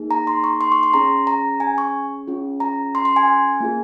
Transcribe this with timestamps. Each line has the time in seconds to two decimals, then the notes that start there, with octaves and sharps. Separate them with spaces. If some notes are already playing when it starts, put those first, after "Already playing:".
Already playing: A#3 D#4 G#4
0.11 A#5
0.27 C6
0.44 C#6
0.61 C6
0.72 C#6
0.83 C6
0.94 C#4 G#4 A#5
1.27 A#5
1.60 G#5
1.78 C#6
2.27 C#4 F4 G#4
2.60 A#5
2.95 C6
3.05 C6
3.16 G#5
3.60 A#3 F4 G#4